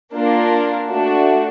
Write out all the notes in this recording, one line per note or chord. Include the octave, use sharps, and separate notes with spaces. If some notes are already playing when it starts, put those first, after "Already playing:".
A#3 D4 F4 A#4
A3 D4 F#4